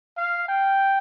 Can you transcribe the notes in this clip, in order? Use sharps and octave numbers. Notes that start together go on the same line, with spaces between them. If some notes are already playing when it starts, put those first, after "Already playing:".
F5
G5